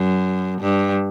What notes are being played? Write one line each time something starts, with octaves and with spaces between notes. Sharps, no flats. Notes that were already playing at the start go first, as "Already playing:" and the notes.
Already playing: F#2
G2